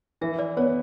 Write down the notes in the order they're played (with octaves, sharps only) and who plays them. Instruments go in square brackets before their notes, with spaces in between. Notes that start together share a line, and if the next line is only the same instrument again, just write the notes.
[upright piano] E3 [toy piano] E5
[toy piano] D5
[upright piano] B3 [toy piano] C#5